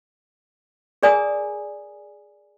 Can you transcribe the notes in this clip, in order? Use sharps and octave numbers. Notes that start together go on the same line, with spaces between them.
G#4 A#4 D5 G#5 A#5 D#6